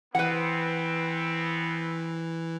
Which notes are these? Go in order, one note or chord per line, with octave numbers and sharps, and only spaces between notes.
E3 B3 C4 B4 F#5